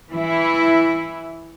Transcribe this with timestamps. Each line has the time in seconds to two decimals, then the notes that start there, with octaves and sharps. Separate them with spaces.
0.12 E3 E4